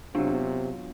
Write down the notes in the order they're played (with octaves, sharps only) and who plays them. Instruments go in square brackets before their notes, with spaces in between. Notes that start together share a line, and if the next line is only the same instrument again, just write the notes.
[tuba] C3 [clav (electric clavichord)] F#3 F4 [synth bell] B3 D4